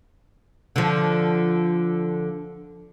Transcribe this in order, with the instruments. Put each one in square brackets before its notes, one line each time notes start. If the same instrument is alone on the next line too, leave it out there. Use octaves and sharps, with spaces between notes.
[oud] D3 F3